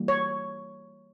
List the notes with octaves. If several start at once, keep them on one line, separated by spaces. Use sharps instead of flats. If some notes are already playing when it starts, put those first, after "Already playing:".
Already playing: E3 G3 A#3
C#5